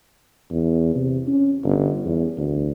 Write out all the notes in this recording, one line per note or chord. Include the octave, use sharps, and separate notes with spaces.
E2
C3
C#4
G1
E2
D2